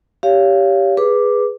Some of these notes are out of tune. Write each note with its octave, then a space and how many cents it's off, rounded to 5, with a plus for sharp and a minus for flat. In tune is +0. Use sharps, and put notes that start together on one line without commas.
G4 +0 C#5 +25 F5 -15
G#4 -5 B4 +0 D6 +0